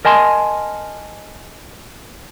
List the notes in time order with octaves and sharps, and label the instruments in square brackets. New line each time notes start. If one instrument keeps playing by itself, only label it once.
[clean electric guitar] A#4 D#5 G#5 A5 C6